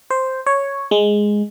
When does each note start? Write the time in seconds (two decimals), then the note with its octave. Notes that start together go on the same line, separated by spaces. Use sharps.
0.10 C5
0.46 C#5
0.91 G#3